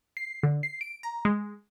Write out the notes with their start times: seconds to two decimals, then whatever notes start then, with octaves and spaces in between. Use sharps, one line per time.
0.17 C7
0.43 D3
0.63 C7
0.81 D7
1.03 A#5
1.25 G#3